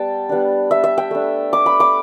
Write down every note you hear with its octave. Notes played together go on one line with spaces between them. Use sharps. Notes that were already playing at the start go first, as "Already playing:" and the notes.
Already playing: G3 B3 G5 A5
G3 B3 D4
E5
E5
G5
A3 D4
D6
B5
D6